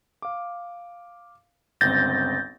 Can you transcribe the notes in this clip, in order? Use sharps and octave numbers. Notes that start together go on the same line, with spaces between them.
F5 D6
G1 C#2 C4 G6 A6 A#6